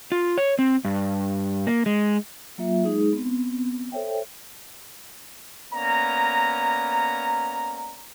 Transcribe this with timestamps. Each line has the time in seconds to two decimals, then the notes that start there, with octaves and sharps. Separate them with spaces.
0.12 F4
0.38 C#5
0.59 C4
0.85 G2
1.67 A#3
1.86 G#3
2.58 F#3 A#3 F4 E5
2.85 G#3 D#4 G#4
3.13 B3 C4
3.92 A4 C5 C#5 E5 G5
5.73 A#3 B3 C#4 D5 A#5